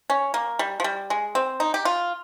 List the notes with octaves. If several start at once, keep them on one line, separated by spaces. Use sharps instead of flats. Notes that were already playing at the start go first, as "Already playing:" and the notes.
C#4
A#3
G3
F3
G3
G#3
C4
D#4
G4
F4